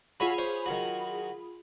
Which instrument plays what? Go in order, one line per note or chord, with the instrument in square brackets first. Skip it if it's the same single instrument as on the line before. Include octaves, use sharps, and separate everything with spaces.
[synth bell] F4 G#4 B5 [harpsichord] F#4 C#5 E5
[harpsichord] C5 C#5
D#3 F#3 F#4